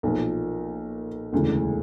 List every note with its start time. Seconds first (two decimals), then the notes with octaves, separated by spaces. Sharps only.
0.03 B1 A#2 F3
1.33 E1 D2 C#3 E3